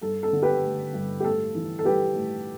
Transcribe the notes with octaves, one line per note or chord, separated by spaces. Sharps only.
G2 A4
A4
D3
G4 B4
A3
G2
G4
A2 A4
E3
A4
G3 G4 B4
A2